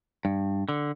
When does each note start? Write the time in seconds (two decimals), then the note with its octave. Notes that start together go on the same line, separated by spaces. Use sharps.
0.25 G2
0.69 D3